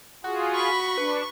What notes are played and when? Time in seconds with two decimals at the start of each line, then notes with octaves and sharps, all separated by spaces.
0.24 F4 F#4 G#4
0.55 B5 C#6
0.98 D4 B4